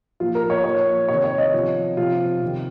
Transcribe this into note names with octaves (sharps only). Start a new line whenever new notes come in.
A#2 F3 F4
A#4
C#5
A#2 F3 C#5
C3 D#3 C#5
C#5
D#5
C3 F3
C3 F3 F4
C3 D#3